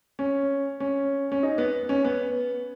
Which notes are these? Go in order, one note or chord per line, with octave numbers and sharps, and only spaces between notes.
C#4
C#4
C#4
D#4
B3
C#4
B3